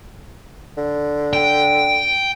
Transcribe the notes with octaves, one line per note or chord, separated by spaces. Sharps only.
D3
G5